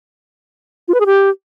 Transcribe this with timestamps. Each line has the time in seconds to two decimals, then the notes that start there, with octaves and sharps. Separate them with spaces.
0.88 F4
0.94 B4
1.00 G#4
1.06 G4